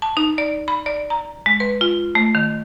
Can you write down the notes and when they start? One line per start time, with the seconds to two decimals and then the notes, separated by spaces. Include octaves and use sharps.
0.02 A5
0.17 D#4
0.38 D5
0.68 B5
0.86 D5
1.10 A#5
1.46 G#3
1.60 B4
1.81 F4
2.15 A3
2.35 D#3